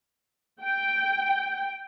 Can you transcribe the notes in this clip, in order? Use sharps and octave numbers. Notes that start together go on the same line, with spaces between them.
G5